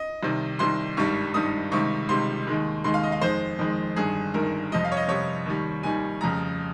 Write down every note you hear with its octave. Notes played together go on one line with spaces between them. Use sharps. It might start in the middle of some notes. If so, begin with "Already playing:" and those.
Already playing: D#5
C2 C3 D#3
C2 C3 D#3 C6
G#1 G2 D#3 G3 C#6
G#1 G2 D#3 G3 D#6
C#2 C3 D#3 G3 C#6
C#2 C3 D#3 G3 C6
D#2 D#3 G#3
D#2 D#3 G#3 C6
F5
D#5
F5
F2 D#3 G#3 C5
F2 D#3 G#3
G1 G2 D#3 G#4
G1 G2 D#3 A#4
F2 C3 G3 D#5
F5
C#5
D#5
F2 C3 G3 C#5
D#2 D#3 G3
D#2 D#3 G3 G#5
F1 F2 C#3 A#5